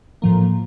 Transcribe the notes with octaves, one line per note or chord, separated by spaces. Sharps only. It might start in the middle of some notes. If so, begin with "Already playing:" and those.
A2 F3 A#3